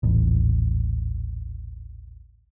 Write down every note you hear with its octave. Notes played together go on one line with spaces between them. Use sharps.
D#1 A1